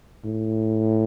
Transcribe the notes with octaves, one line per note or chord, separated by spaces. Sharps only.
A2